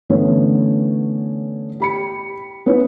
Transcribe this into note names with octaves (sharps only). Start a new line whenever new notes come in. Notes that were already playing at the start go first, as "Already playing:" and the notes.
D3 E3 A3 B3 C#4
G4 B5 C#7
B3 C#4 E4 B4